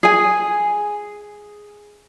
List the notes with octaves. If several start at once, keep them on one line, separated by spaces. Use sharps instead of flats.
G#4 G#5